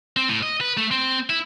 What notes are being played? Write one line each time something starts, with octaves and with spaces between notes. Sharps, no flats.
C4
A2
D#5
B4
A3
C4
E4